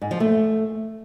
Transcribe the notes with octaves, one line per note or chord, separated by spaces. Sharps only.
G#2
F3
A3